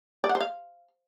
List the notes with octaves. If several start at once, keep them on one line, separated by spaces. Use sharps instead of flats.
D5
F#5
C5
F5